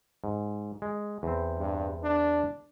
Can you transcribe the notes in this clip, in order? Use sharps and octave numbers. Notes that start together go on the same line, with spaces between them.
G#2
G#3
E2 C4
G2
D4